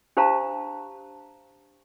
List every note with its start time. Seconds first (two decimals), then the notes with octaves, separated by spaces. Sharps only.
0.17 D4 G4 C5 F5 A5 A#5